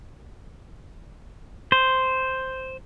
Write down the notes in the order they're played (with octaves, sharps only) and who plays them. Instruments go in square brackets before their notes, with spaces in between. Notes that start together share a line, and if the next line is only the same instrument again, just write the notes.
[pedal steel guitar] C5